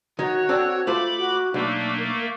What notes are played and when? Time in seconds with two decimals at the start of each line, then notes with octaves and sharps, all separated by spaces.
0.19 D#3 F#4 C#5
0.49 C4 D4 A4
0.87 A3 F4 C5 B5 D6
1.18 F#4
1.54 B1 A3 A#3 D4
1.98 A#4